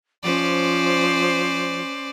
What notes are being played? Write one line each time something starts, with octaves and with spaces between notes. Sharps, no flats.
F3 C#4 C5 D5